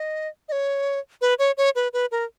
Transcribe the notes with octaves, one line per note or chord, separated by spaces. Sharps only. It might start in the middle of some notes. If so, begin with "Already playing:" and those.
Already playing: D#5
D#5
C#5
B4
C#5
C#5
B4
B4
A#4